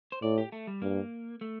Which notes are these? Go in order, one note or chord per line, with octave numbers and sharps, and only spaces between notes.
C5
A2 D5
G4
A3
G3
G2 A#3
A3